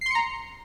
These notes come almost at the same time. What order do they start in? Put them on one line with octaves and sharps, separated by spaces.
C7 C6 C#7 A#5